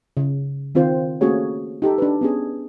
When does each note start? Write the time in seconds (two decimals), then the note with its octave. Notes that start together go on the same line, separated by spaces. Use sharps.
0.17 C#3
0.75 D#3 C4 F4 C5
1.21 A3 A#3 C#4 F#4 G#4 C#5
1.82 D#4 G4 A4
1.98 D4 B4
2.21 B3 C#4 G#4